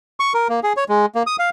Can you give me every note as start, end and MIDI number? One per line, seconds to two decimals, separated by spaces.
0.20 0.33 85
0.34 0.48 70
0.49 0.60 58
0.63 0.73 68
0.77 0.84 73
0.89 1.06 56
1.15 1.23 58
1.27 1.36 87
1.39 1.50 77